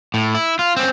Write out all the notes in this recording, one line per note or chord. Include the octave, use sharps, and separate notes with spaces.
A2
E4
F4
C4 C#4